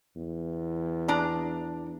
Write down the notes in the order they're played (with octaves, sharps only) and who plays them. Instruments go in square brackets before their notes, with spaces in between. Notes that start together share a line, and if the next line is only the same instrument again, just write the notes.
[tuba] E2
[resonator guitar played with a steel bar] D4 A#5